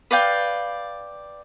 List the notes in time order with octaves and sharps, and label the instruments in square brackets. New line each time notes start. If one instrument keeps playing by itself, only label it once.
[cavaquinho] B4 D5 F5 G5